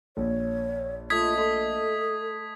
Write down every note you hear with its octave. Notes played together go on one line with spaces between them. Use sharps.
A#1 C#5
A3 F4 D#5 D#6 G#6 B6
A4 D#5 C6